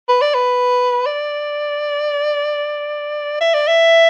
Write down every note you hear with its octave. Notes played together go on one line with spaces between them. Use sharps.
B4
D5
B4
D5
E5
D5
E5